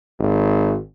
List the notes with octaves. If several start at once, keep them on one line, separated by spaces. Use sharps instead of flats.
G#1